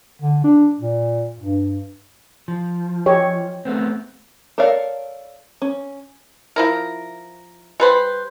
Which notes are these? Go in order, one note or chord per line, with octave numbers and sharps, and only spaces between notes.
D3
D4
A#2
G2
F3
G4 C#5 D#5
A3 B3 C4
A4 A#4 C#5 D5 F5
C#4
F3 E4 A#4
G3 B4 C5